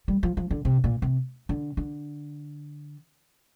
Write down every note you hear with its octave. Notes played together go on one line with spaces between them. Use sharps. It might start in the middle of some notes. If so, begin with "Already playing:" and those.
G3
F3
F3
D3
C3
A#2
C3
D3
D3